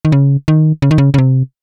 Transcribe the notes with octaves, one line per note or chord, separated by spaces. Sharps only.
D#3
C#3
D#3
C#3
D#3
C#3
C#3
C3